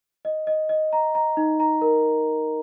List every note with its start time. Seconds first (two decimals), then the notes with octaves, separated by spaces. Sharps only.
0.25 D#5
0.47 D#5
0.69 D#5
0.93 A#5
1.15 A#5
1.37 D#4
1.60 A#5
1.81 A#4